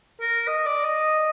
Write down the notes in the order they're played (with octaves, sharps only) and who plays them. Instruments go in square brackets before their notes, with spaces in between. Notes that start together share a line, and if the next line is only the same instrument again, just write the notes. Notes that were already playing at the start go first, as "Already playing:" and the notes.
[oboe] A#4
D#5
D5
D#5